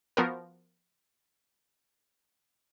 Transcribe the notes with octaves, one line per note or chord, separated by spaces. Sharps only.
F3 B3 F#4 A#4